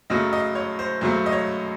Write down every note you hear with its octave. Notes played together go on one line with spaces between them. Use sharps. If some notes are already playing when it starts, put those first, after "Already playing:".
F#2 C#3 F#3 A3 D#5
D#5
C#5
C5
F#2 C#3 F#3 A3 C5
D#5
C#5